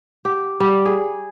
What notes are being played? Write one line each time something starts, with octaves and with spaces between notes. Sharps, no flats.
G4
G3
G#4